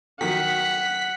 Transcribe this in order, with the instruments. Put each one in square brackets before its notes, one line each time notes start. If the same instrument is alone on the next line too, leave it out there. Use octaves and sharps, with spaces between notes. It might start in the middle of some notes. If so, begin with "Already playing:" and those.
[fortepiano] D#3 F#3 [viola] F#5 [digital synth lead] B6